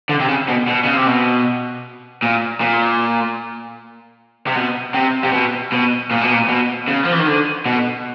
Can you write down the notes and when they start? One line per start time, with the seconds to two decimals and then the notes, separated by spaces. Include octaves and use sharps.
0.09 D3
0.20 C3
0.29 C#3
0.48 B2
0.68 B2
0.84 C#3
0.95 C3
1.07 B2
2.22 A#2
2.61 A#2
4.47 C3
4.56 B2
4.94 C3
5.24 C3
5.32 B2
5.72 B2
6.11 A#2
6.21 B2
6.32 A#2
6.48 B2
6.88 C#3
7.05 F3
7.13 E3
7.19 D#3
7.27 D3
7.66 B2